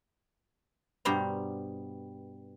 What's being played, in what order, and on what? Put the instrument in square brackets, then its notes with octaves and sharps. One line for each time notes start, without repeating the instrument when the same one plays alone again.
[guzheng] G2 B2 G3 C5 A#5